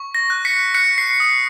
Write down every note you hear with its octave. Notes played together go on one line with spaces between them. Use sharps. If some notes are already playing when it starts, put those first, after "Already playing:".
Already playing: C#6
A#6
F#6
B6 C#7
F#6 B6 C#7
C7
D#6